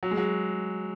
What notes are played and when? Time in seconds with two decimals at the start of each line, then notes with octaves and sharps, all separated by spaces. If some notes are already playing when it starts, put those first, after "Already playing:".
0.03 F#3
0.11 G#3
0.17 F#3